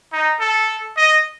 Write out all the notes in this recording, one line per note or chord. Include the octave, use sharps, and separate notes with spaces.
D#4
A4
D#5